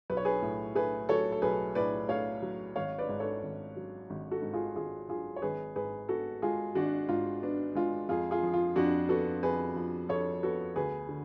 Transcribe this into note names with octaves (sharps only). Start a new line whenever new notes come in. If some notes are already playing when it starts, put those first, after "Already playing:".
B1 B4
C#5
G#4 B4
A2
A3 G#4 B4
F#3 A4 C#5
A4
B1 G#4 B4
A2 B4 D5
A3 C#5 F5
F#3
G#1 C#5 F5
B4 D5
G#2
A4 C#5
G#1
F#3
G#1
F#4 A4
G#2
F4 G#4
G#1 F4 G#4
F#3 F4 G#4
C#5
G#1 G#4 B4
G#2 G#4 B4
B3 F#4 A4
G#3 F4 G#4
G#1 D4 F#4
G#2 F4
B3 D4
G#3 F4
F2 F4 G#4
F4 G#4
F3
F4
F2 D4 F#4
B3 F#4 A4
F2 G#4 B4
F3
F2 A4 C#5
B3 F#4 A4
D2 G#4 B4
D3